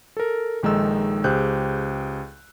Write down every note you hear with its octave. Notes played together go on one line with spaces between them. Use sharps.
A4 A#4
A#1 D#3 G#3 D#4 A4 E6
C#2 G4 G#4 C5 F#6 G6